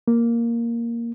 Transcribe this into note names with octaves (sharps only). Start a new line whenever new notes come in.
A#3